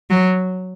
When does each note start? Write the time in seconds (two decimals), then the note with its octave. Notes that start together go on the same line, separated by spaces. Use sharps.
0.10 F#3